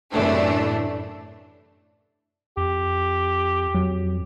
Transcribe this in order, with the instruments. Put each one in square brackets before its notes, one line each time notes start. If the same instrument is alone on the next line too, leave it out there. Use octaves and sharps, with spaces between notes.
[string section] F#2 A2 C3 E3 A3 D4
[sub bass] F2 [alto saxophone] G4
[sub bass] F2 [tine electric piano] F#3